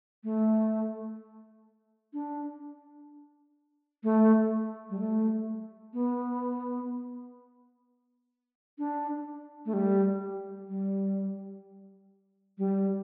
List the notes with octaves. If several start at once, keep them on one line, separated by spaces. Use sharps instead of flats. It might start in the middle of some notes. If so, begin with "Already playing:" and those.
A3
D4
A3
G3
A3
B3
D4
A3
G3
G3
G3